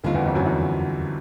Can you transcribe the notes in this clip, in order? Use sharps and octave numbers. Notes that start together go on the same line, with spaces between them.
D#2 D3 D#3 G3 C4 F4
E2 E3
F2 F3
F#2 F#3
E2 E3